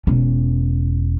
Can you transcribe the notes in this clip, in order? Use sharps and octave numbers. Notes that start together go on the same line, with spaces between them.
E1 C#4